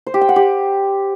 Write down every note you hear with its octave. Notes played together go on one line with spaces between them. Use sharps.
C5
G4
G5
F#5
G4